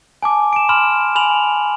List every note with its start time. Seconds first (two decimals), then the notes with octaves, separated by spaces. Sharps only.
0.22 G#5 A5 D6
0.53 D7 E7
0.69 B5 C6 F6 E7
1.15 G#5 B5 F7 F#7